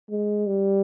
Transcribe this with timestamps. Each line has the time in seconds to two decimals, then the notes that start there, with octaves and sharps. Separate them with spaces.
0.10 G#3
0.47 G3